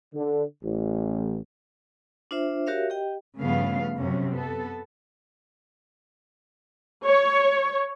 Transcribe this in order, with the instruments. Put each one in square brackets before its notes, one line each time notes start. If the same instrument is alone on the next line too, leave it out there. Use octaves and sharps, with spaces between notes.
[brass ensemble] D3
A1
[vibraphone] D4 F4 C5 E5
F#4 G4 A#4 C#5 E5 F5
G4 D#5 G5
[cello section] G2 C#3 F3 A3 B3 F5
F#2 C3 C#4
B3 A4
[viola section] C#5